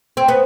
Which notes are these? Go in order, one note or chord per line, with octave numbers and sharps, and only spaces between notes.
C4
B3